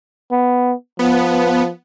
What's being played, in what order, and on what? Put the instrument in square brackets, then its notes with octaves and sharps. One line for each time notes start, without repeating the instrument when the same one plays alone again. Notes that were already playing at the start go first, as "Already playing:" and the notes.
[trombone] B3
[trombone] F3 [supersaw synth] B3